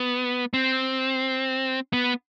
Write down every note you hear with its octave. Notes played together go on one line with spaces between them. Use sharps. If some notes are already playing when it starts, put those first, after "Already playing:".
Already playing: B3
C4
B3